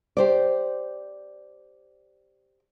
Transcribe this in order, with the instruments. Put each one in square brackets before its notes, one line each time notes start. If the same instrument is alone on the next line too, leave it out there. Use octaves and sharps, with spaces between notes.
[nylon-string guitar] G4 C5 D5